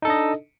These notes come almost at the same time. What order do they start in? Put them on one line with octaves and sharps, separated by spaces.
D#4 A4 D4 D#5